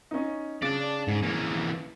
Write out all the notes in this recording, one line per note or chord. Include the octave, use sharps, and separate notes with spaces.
C#4 D#4
C#3 D5 A5
G#2
E3 A#3